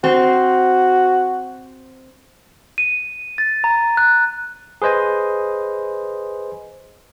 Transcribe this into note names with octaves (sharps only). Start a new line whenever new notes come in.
C4 F#4
D#7
A6
A#5
F#6
G#4 B4 C5 D#5 G#5